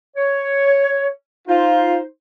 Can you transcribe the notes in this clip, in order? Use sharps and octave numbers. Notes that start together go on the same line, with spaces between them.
C#5
D#4 F4 C5